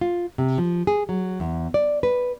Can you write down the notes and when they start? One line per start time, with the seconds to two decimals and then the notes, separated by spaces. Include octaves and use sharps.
0.01 F4
0.38 C3
0.58 F3
0.87 G#4
1.09 F#3
1.40 E2
1.74 D5
2.03 B4